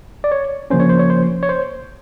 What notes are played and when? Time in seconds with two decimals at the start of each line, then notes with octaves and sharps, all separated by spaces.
0.24 D5
0.32 C#5
0.70 C#3 F3 A#3 C#4 C5
0.80 C#5
0.89 C5
0.99 C#5
1.10 C5
1.43 C#5
1.49 C5